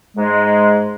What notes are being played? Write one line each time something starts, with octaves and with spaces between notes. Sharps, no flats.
G#2 G#3